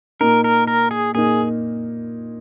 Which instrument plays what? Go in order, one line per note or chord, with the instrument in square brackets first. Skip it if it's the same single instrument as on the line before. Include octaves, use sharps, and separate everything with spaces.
[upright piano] A#2 A#3 D#4 [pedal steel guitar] A#4
[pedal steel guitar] A#4
A#4
G#4
[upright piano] A#2 A#3 D#4 [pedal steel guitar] G#4